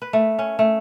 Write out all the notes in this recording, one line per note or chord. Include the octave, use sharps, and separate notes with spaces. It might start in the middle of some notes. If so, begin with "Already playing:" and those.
B4
A3
C#4
A3